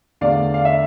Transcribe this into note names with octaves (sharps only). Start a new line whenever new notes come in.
E2 D3 A3 D5 F5
F5
E5